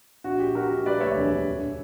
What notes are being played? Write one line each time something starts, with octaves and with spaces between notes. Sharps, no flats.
A#1 F#4
A#1 G4
A#1 F#4 A#4
A#1
G3 B4 D5
D2 C#5 E5
E1
E1
G1